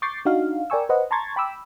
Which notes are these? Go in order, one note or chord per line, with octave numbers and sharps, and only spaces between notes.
C#6 D6 G6 A6 C7
D4 D#4 F#4 F5
A#4 D5 G5 G#5 C#6 E6
B4 C5 D#5 F#5
A5 A#5 C6 C#6 G#6 A6
G5 B5 D6 E6